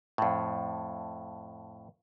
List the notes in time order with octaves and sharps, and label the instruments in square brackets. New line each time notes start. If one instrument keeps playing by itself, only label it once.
[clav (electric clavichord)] F2 A2